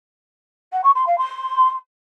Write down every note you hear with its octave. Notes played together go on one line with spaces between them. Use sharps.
F#5
C#6
C6
F5
C6